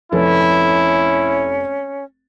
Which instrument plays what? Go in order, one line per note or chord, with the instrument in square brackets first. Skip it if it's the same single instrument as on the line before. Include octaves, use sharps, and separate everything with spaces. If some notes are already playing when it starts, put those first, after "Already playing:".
[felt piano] F1 A4 B4 [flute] C#4 [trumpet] E4